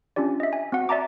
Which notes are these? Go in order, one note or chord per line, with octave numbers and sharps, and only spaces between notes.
C#4 D4 F4 G4 D5
D#5 E5
G#5
C4 F#4 F#5
D5 E5 A5 A#5 D6